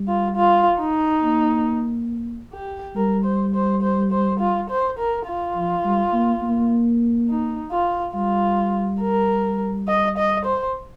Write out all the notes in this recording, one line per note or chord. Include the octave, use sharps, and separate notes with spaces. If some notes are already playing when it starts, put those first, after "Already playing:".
Already playing: G3
F4
F4
D#4
A#3
G4
G3 A#4
C5
C5
C5
C5
F4
C5
A#4
F4
F3
G3
A#3
A#3
D#4
F4
G3 F4
A#4
D#5
D#5
C5